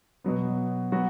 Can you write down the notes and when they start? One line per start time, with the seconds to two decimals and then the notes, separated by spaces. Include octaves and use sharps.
0.24 B2 F#3 B3
0.92 F#3 B3 F#4